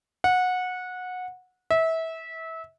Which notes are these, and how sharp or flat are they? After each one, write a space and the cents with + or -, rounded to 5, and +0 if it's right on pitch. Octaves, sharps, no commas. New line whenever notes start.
F#5 -20
E5 -25